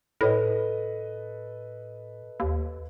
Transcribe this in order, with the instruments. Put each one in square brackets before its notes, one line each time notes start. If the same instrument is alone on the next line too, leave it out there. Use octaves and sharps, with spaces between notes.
[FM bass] A2 [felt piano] A4 B4 D#5
[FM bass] D#2